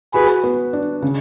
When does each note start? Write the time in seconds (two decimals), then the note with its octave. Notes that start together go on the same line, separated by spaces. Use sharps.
0.14 F#4 G#4 B4
0.44 B3
0.73 D4
1.02 C#3